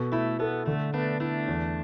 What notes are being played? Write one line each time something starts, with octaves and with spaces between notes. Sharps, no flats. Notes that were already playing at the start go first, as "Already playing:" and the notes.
Already playing: B2 A4
A3 E4
B3 A4
D3 A3
A3 B3 D4
A3 D4 E4
E2